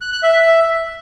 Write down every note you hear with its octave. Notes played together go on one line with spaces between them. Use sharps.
F#6
F#6
E5